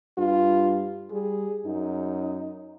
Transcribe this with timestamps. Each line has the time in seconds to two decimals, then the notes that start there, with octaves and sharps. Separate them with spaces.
0.18 G2 F4
1.12 G3 G#4
1.66 F#2 D#4